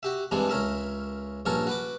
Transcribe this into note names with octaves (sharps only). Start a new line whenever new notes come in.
F#4 G4 E5
G2 E3 G3 G#3 C4 D4
C#2 C#4 A#4 E5
A#1 G2 C#4 A4 A#4 C#6
F#4 B4 D6